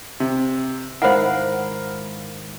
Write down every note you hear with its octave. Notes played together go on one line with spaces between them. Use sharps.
C3
G#2 D#3 E4 A#4 C5 F5 F#5 B5